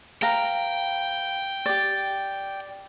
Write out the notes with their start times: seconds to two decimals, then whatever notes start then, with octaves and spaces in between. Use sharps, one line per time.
0.22 B4 F5 G5 A#5
1.66 G4 D5